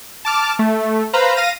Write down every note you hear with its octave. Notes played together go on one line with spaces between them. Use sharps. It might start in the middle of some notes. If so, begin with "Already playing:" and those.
A5 D6 F6
A3
B4 C5 F5 A#5 B5
F5 A#6 D#7